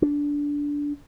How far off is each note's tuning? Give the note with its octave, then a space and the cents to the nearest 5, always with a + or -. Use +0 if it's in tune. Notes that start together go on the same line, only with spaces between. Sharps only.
D4 -15